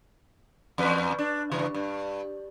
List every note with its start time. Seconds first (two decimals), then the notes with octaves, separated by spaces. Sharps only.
0.78 E2 B4
1.18 D4
1.51 G2 C#3 E3
1.74 G2